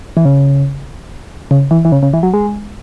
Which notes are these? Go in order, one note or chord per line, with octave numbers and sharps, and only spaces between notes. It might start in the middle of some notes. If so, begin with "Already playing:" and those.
E3
C#3
C#3
E3
E3
C#3
C#3
E3
F#3
G#3